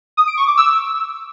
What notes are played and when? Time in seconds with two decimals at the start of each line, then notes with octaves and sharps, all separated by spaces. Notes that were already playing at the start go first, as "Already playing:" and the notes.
0.17 D#6
0.27 D7
0.37 C#6
0.47 D6
0.57 E6